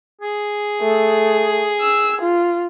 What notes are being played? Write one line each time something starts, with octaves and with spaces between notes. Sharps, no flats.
G#4
A3
E6
F4